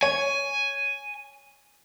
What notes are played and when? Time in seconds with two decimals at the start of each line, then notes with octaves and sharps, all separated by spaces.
0.03 C#5 G#5